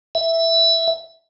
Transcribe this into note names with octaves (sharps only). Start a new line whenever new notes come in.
E5